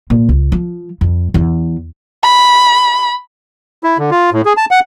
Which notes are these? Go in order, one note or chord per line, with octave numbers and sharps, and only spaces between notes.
A#2
C#2
F3
F2
E2
B5
E4
D3
F4
A2
G#4
A5
F#5